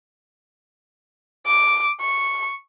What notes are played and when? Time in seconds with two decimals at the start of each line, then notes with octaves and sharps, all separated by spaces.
1.47 D6
2.01 C#6